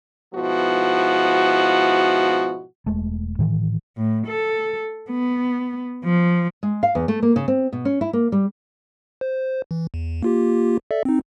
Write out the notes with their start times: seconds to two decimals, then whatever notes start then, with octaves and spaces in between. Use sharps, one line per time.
0.34 G#2 B2 F3 B3 E4 F#4
2.86 E1 G#3 A3
3.39 A2 D#3 E3
3.97 A2
4.27 A4
5.10 B3
6.04 F3
6.63 G#3
6.83 F5
6.95 E2
7.08 A3
7.22 A#3
7.36 C#3
7.48 C4
7.73 B2
7.85 C#4
8.01 E4
8.13 A#3
8.32 G3
9.21 C5
9.71 E3
9.94 E2
10.23 A#3 F4 G4
10.91 A4 D5 E5
11.05 C4 D#4